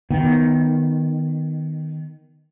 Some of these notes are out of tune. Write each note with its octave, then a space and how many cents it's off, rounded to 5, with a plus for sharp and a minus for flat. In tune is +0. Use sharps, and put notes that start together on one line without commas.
D#3 +0 B3 +0